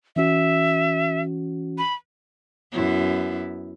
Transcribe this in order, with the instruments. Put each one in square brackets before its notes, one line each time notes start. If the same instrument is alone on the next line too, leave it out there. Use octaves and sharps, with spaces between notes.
[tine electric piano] E3 C#4 F#4 [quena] E5
[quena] B5
[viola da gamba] F#2 B3 E4